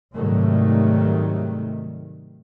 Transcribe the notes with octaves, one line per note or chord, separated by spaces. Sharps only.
G#2 C3 D#3 F#3 G3 A3